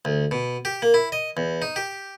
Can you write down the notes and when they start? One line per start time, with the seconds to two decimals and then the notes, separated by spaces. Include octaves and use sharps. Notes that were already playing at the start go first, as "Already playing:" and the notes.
0.05 D2
0.31 B2
0.65 G4
0.82 A#3
0.94 E4
1.12 D#5
1.37 E2
1.62 D#4
1.76 G4